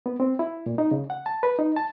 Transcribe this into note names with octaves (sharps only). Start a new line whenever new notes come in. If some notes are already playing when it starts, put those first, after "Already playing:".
B3
C4
E4
A#2
D#4
C#3
F#5
A5
B4
D#4
A5